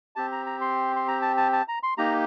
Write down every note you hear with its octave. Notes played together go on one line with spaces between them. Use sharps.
C4 G4 A5
A#5
A#5
C6
C6
A#5
A5
A5
A5
A#5
C6
A#3 D#4 G4 A#5